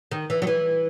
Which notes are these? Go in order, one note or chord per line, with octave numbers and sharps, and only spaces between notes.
D#3
E3
F#3
E3